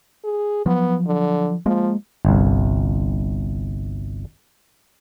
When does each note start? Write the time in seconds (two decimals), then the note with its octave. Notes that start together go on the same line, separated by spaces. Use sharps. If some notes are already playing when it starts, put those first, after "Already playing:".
0.24 G#4
0.66 F3 F#3 B3
1.07 D3
1.66 F3 G#3 A#3
2.25 G1 C2